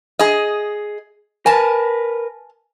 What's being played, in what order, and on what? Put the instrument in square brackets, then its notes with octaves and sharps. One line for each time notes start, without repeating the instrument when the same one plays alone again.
[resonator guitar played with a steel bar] G#4 D#5
[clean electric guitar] A#4 B4 [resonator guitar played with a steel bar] G#5 A5